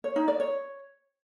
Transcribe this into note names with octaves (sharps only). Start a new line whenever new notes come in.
C#5
D#4
D5
C#5